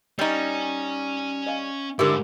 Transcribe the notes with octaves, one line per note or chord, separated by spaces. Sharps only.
G3 C#4 D#4
D#5 F5 G#5
G#2 D3 E4 G4 A#4 D6